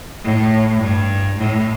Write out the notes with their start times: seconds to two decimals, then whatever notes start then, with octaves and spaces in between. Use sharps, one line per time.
0.24 A2
0.81 G2
1.37 A2